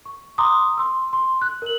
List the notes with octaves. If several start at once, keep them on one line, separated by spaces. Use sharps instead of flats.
C#6
A#5 C6 D6 D#6
C6 E6
C6
F#6
A#4 F#7